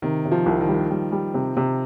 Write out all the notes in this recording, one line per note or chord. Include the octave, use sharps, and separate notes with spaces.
C3 D#3
C3
F3
C2
D#3
G3
G3
G3
C3
C3